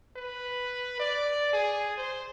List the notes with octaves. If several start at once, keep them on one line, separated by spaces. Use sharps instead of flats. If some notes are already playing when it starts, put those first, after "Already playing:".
B4
D5
G#4
C5